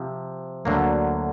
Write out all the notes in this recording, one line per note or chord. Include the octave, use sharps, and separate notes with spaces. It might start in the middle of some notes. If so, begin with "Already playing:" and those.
Already playing: C3 F3
D2 D3 F#3 A#3